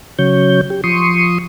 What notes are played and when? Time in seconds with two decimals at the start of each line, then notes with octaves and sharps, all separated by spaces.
0.19 C#3 F#3 C#5 G6
0.70 G4
0.84 F3 C6 C#6 D#6